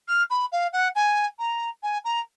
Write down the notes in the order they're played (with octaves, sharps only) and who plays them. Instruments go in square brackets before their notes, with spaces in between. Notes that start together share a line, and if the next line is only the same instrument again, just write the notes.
[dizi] F6
B5
F5
F#5
G#5
A#5
G#5
A#5